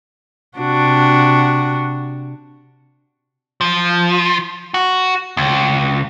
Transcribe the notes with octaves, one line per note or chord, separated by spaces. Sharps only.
C3 D4 F#4
F3
F#4
C#2